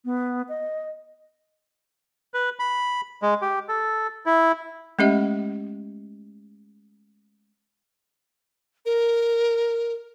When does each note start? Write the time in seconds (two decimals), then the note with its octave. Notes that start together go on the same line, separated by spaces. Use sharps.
0.05 B3
0.49 D#5
2.34 B4
2.59 B5
3.22 G#3
3.42 G4
3.69 A4
4.26 E4
4.99 G#3 A3 C#4 G4 D#5 E5
8.86 A#4